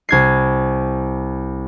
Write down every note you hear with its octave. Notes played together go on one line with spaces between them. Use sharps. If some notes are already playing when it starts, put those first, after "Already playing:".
C2 G#6 C7